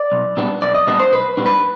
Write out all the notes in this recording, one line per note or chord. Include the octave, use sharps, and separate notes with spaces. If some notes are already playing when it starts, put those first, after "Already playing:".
Already playing: D5
B1
A#2 G3 B3 D4
B1 D5
D#5
A#2 G3 B3 D4 D#5
C5
B1 B4
A#2 G3 B3 D4
B4